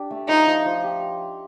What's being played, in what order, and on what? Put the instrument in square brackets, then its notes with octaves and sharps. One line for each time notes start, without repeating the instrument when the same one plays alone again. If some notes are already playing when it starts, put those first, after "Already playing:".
Already playing: [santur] D4 G4
A3
[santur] F3 [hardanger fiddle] D#4
[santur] F3
F3
G4